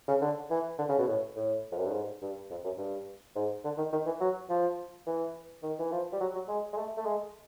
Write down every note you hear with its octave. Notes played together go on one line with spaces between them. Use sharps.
C#3
D3
E3
D3
C#3
B2
A2
A2
F2
F#2
G2
G#2
G2
F2
F#2
G2
G#2
D3
D#3
D#3
E3
F#3
F3
E3
D#3
E3
F3
G3
F#3
F#3
G#3
G#3
A3
A3
G#3